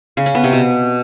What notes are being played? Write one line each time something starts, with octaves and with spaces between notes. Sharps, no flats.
C#3
C#4
B3
C3
B2